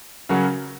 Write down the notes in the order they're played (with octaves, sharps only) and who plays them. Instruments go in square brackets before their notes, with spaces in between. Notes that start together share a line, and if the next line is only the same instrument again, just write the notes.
[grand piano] C#3 F#3 C#4 F#4 A#4